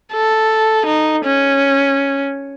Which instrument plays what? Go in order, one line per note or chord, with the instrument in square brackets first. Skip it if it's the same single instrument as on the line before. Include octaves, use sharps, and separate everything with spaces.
[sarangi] A4
D#4
C#4